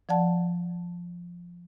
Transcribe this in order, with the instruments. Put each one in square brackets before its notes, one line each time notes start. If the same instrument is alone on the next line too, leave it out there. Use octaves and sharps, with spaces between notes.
[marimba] F3 D5 F#5 A5